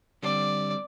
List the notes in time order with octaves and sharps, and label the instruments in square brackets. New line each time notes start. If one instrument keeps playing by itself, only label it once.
[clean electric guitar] D3 G3 C4 [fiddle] D5